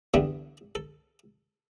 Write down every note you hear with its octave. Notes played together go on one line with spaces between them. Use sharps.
E2 D3 G3 B3 D4 E5
A4